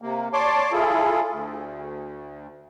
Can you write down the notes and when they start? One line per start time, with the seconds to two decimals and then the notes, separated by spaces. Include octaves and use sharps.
0.02 C3 A#3
0.33 C#5 D5 A5 C6 D6
0.72 E4 F4 G#4 A4
1.31 D2